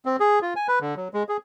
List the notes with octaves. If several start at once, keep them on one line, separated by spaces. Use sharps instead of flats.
C4
G#4
F4
G#5
B4
D3
F#3
G#3
G#4